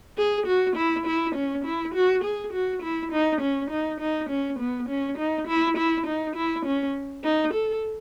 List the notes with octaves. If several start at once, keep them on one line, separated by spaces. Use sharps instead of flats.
G#4
F#4
E4
E4
C#4
E4
F#4
G#4
F#4
E4
D#4
C#4
D#4
D#4
C#4
B3
C#4
D#4
E4
E4
D#4
E4
C#4
D#4
A4